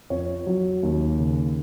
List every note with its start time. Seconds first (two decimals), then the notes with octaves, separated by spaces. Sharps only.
0.10 F2 C#5
0.47 F#3
0.83 D#2
1.18 C#3